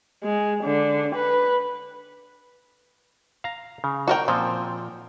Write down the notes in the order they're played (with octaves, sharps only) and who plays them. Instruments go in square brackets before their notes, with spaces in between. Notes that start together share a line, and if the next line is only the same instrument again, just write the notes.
[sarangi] G#3
D3
B4
[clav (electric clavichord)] F5 A#5
C#3
[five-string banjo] F#4 A#4 G5
[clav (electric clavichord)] A#2 F3 [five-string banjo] C4